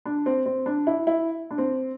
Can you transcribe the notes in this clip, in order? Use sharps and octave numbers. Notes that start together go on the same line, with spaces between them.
D4
C4
C4
D4
E4
E4
D4
C4